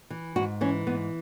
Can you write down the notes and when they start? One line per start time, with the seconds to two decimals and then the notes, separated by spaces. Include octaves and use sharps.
0.10 E3
0.36 G#2 F#4
0.61 E3 C#4
0.87 G#2 B3